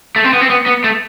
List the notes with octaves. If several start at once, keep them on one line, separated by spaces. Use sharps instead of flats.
A3
C4
B3
C4
B3
B3
A3